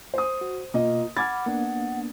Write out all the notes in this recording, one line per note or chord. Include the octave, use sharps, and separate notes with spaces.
C5 D#6
F#4
B2 A#3 F4 D#5
F#5 B5 D6 F6 G#6 A6
A#3 B3 D4